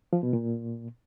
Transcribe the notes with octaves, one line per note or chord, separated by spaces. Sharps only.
F3
B2
A#2